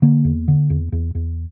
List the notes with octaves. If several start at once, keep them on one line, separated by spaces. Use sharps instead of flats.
D3 A#3
E2
D3
E2
E2
E2